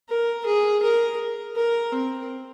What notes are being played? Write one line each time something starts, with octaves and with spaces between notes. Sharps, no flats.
A#4
G#4
A#4
A#4
C4